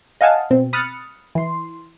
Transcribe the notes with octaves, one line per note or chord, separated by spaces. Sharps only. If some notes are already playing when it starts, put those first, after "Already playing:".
D#5 F5 F#5 G#5 A5
B2 C4
B5 D#6 F6 F#6 A6 C#7
E3 C6